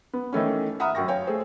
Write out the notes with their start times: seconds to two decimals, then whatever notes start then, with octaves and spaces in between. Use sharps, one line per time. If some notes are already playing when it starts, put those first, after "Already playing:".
0.13 B3
0.33 D#3 E3 A3 C#4
0.80 E5 F#5 A#5 B5 D#6 F6
0.95 F#2 G5 C#6 A#6
1.08 C#5 F5 G5 G#5
1.27 A3 G#4 C5